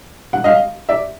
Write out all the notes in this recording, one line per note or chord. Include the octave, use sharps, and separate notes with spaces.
F#5
D#5 F5
D5 E5